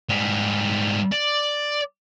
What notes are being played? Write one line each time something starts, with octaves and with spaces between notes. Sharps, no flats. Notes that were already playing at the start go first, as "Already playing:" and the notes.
G#2 G3
D5